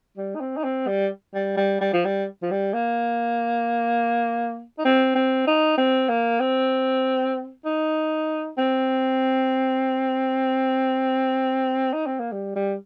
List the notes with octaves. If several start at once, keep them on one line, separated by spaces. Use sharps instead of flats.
G3
D#4
C4
D#4
C4
G3
G3
G3
G3
F3
G3
F3
G3
A#3
D#4
C4
C4
D#4
C4
A#3
C4
D#4
C4
D#4
C4
A#3
G3
G3